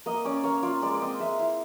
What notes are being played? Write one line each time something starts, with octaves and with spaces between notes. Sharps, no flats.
A#3 D#5
C#4 D5
A#3 C#5
F4 D5
G#3 D5
D5
C4 D#5
G#3 E5
E4 F5